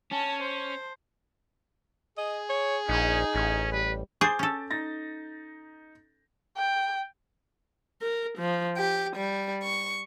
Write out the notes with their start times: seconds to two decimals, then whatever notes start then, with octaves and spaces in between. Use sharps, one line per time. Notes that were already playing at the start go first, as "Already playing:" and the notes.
0.12 C#4 A5
0.42 C5
2.18 G#4 D#5
2.49 C#5
2.89 A#1 C#4 D#4
3.34 A1 C#4
3.73 G3 B4
4.21 G#4 C5 D6 G6 A6
4.39 C#4 A4
4.70 D#4 A6 A#6
6.57 G5
8.02 A#4
8.38 F3
8.77 G4
9.16 G3
9.64 C#6